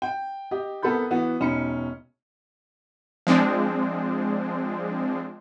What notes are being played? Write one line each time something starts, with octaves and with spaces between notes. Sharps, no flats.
G5
G4 D#5
C2 B3 A4 A#4 B5 G6
E3 B3 F#4
E1 C#4 D#4 B5 C#7
F3 G#3 C4 D4